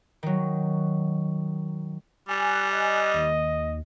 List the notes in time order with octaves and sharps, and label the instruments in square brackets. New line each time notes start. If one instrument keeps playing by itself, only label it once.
[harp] D#3 F#3
[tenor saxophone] G3 [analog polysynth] G#5 F#6
[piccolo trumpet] D#5
[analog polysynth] D#2